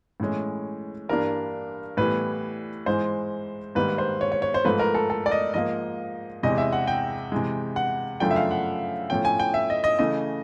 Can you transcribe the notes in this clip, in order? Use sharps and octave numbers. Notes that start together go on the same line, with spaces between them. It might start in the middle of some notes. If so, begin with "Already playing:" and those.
A2 E3 G#3 C#4
G2 E3 G3 A#3 D4 A#4
A2 E3 G3 B3 B4
G#2 E3 G#3 C5
G#2 D#3 G3 A#3 B4
C5
C#5
C#5
C#5
C5
G#2 F3 A3 B4
A#4
A4
A4
D5
D#5
G#2 F3 A#3 D#5
E2 C3 E3 G#3 D#5
E5
F#5
G5
C3 E3 G#3
F#5
F#2 C#3 F3 A3 D4 G5
E5
F5
F#5
A2 F3 A3 C#4 G5
G#5
G5
E5
D#5
D#5
C#3 E3 A3 D#5